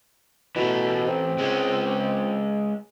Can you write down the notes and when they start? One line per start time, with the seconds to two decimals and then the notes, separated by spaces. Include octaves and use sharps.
0.56 B2 E3 A3
1.07 C4
1.38 G#3 C#4